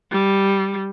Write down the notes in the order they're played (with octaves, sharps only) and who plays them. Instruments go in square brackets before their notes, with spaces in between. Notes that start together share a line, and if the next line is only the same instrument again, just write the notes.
[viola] G3